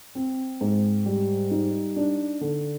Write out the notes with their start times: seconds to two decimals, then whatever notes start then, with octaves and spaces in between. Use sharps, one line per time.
0.15 C4
0.61 G#2
1.06 G3
1.51 D#4
1.96 D4
2.41 D3